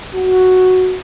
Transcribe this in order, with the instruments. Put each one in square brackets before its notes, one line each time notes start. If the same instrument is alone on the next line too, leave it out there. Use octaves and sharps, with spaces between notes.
[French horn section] F#4